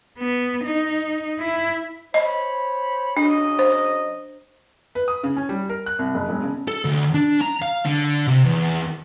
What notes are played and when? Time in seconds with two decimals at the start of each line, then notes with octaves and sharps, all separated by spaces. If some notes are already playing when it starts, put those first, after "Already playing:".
0.18 B3
0.64 D#4
1.39 E4
2.14 C5 C#5 D#5 B5
3.17 C#3 F#3 D4 D#5
3.59 C5
4.95 B4
5.08 D#6
5.23 C#3
5.36 C#4
5.49 G3
5.69 A#4
5.86 F#6
5.99 C2
6.14 F#1
6.29 E1
6.42 C#3
6.68 A4
6.85 D2
7.14 D4
7.41 A#5
7.62 F5
7.85 D3
8.27 C3
8.45 E2